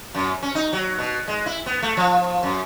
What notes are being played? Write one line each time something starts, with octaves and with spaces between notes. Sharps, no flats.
F#2
C#4
D#4
F#3
B2
G#3
E4
B3
A3
F3
F#2